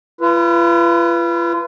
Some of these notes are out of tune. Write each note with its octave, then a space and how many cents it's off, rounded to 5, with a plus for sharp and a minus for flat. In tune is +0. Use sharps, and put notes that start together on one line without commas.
F4 -40 B4 +0